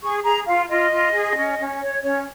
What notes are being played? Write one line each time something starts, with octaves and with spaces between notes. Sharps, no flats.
G#4 C#6
G#4 A#5
F4 F5
F4 D#5
F4
G#4
C#4
C#4
C#5
C#4 C#5